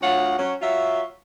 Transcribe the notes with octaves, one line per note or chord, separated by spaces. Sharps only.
D2 F4 C#5 F#5
F#3 C#4
F#3 F4 C#5 E5